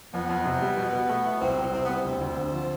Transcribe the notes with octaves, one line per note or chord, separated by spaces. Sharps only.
F2 B3
F2
C3
G3
B2
B2
A3
E4
C2 C4
C2
C3 C4
G3 B3
C4
D2
D2
D3
F3